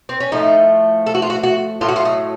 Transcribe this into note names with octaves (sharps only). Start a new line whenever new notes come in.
C4
C#4
A2 F3 A3 D#4
A4
F#4
F4
F#4
F#4
A2 F#3 A3 F4
F#4
F4
D#4